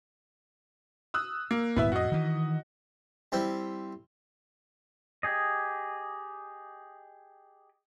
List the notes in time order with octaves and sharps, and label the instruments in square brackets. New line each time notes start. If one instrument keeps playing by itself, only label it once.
[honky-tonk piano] D#6 E6 F#6
A#3
[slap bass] D#1 G#1 [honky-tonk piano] B3 E4 E5
[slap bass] F2 A2 [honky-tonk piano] F#4 D#5
[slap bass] D#3 E3
[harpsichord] G3 C4 E4
[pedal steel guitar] G4 G#4 D#5